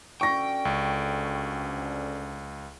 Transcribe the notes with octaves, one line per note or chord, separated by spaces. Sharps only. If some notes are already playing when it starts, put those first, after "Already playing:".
D2 D3 C#4 G5 C#6 A#6
C#2